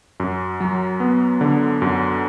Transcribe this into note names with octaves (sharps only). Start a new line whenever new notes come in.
F#2
F#3
B3
D3
F#2